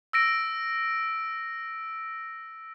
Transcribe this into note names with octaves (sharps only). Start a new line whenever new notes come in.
E6 A#6 D7